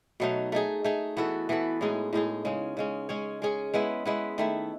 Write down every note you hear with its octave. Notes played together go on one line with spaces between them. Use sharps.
B2 F#3 A3 D#4
A3 D#4 G#4
A3 D#4 G#4
E3 B3 F#4 A4
E3 B3 F#4 A4
A2 G#3 D#4 G#4
A2 G#3 D#4 G#4
C#3 G#3 C#4
C#3 G#3 C#4
G#3 C#4 G#4 C#5
G#3 C#4 G#4 C#5
G#3 B3 E4 B4
G#3 B3 E4 B4
D#3 A3 E4